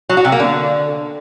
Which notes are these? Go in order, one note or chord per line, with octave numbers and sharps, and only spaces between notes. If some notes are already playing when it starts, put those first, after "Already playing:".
F#3
F#4
C3
A#3
D3